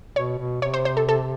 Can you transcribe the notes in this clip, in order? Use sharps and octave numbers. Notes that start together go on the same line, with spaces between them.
B2 C#5
B2
C3 C#5
C5
C5
A4
A4